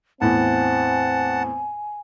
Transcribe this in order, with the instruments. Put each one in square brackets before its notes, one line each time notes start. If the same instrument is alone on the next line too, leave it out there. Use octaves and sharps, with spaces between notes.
[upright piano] E2 A2 [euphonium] C4 [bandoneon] F#5 A5 [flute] G#5